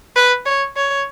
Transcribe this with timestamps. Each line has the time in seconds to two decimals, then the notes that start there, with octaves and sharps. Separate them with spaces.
0.16 B4
0.46 C#5
0.77 C#5